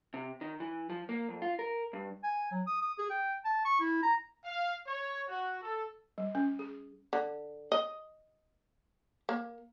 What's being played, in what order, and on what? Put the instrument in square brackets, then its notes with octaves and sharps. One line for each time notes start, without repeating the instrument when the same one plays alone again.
[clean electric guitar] C3
D#3
E3
F3
A#3
F2
F4
A#4
G2
[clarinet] G#5
F#3
D#6
D#6
G#4
G5
A5
C#6
E4
A#5
[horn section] F5
C#5
F#4
A4
[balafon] G3
C#4
G#4
[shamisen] D3
D#5
A#3